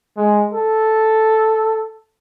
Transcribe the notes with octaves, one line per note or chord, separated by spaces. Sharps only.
G#3
A4